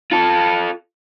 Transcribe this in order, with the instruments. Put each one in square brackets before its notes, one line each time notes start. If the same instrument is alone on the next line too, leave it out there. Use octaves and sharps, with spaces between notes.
[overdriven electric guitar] F4 A4